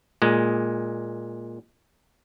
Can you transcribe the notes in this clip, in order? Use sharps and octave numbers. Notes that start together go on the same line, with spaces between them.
A#2 G#3